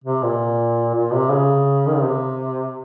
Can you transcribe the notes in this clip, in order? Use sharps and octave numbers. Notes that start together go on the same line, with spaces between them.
C3
A#2
A#2
C3
C#3
D#3
C#3
C3